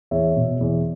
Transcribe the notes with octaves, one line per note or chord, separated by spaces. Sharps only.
E2 C#5 E5
B2
E2